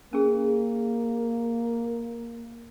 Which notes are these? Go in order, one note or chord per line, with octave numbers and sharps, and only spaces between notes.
A#3 C#4 G#4